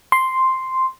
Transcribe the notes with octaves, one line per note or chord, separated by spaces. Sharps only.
C6